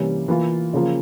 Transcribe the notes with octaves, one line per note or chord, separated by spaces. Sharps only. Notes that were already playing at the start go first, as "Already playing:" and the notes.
Already playing: C3 E3 G3 A#3 C#4
E3 A#3 F4
C#3 F3 A#3